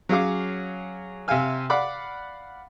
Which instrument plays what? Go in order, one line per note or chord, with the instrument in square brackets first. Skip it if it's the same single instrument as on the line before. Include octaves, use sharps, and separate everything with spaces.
[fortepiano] F#3 C#4 G#4 F5 D6
C3 G4 E5 F5 G#5 F6
D5 F5 F#5 B5 D6